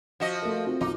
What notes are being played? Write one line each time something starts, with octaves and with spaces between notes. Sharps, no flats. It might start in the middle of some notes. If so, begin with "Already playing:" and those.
F3 F#4 D#5
A3 A#4
C4 F4 F#4
B1 D#4 F4 D6